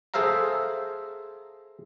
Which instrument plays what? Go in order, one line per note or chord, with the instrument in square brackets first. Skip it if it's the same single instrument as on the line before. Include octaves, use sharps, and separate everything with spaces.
[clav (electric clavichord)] G#4 A4 C5 E5 F5 A#5